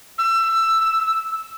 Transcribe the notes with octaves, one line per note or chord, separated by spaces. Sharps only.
E6